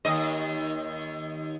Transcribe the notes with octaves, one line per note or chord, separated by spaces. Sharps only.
D#2 D#5